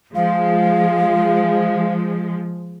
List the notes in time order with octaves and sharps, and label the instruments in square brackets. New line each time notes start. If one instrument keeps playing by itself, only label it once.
[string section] F3 G#3 [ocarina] F5